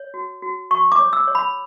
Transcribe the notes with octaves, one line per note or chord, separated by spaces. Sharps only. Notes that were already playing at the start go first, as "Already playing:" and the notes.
Already playing: C#5
F#4
F#4
F#4 C#6
D6
C#5
E6
C#5
B5